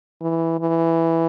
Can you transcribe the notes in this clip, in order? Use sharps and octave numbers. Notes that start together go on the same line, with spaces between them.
E3
E3